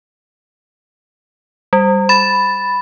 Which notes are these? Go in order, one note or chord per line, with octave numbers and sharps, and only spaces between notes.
G3
B5 A6